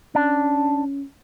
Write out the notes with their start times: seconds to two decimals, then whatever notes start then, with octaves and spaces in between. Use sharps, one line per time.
0.15 C#4 D4